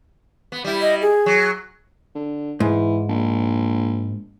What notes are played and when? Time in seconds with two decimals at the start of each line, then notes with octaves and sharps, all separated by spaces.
0.52 B3
0.64 G3 E4
0.81 D#5
1.02 G#4
1.26 F#3
2.15 D3
2.60 G#2 E3
3.09 A#1